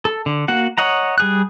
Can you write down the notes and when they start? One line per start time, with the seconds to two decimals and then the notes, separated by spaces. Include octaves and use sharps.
0.05 A4
0.26 D3
0.48 A#3 F#4 F#5
0.78 C#5 D#5 F#5 A#5
1.18 G3 G#4 F#6